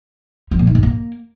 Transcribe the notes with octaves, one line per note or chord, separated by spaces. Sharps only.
F3
A#2
D#3
G#2
A#3